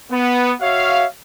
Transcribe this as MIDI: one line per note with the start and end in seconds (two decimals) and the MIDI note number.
0.11 0.52 59
0.61 1.05 66
0.61 1.05 73
0.61 1.05 76
0.61 1.05 77